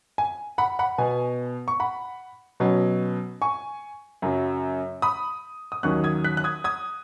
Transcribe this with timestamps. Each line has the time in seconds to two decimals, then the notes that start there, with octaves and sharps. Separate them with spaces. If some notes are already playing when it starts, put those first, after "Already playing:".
0.18 G#5
0.58 F#5 B5
0.79 F#5 B5
0.98 B2 B3 G#5
1.68 C#6
1.80 F#5 B5
2.60 B2 F#3 C#4
3.42 G#5 C#6
4.22 F#2 C#3 F#3
5.02 B5 D#6
5.72 D#6
5.83 D#2 D#3 F#3 C#4 C#6 F#6
6.04 D#6 G#6
6.24 F#6 B6
6.37 F#6
6.44 D#6 G#6
6.64 D#6 G#6